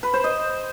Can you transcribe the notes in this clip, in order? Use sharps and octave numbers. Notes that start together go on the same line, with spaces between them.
B4
C5
D#5